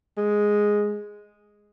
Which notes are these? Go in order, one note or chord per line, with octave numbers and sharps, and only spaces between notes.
G#3